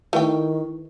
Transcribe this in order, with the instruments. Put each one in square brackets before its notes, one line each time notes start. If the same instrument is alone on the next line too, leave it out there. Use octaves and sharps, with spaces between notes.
[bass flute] D#3 [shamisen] A3 G5 [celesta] E4 B4 C#6